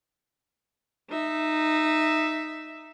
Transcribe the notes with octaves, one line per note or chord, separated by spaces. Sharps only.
D#4 E5